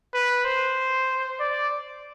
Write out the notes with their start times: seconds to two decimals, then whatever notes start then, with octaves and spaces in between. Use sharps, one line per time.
0.14 B4
0.45 C5
1.40 D5